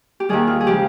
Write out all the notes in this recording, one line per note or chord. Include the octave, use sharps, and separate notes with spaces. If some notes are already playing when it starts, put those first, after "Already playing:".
G4
D#2 D#3 G3 G#4
F4
G#4
C#3 F3 G#3 G4